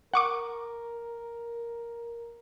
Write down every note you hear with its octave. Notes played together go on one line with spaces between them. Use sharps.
A#4 F#5 C#6 D6